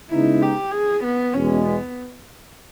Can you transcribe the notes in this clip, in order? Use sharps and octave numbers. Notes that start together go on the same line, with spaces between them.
C#3 G#3 B3 D#4 E4
G4
G#4
B3
E2 B2 G#3 C#4
B3